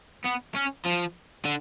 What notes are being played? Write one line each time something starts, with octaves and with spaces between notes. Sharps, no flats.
B3
C#4
F3
D3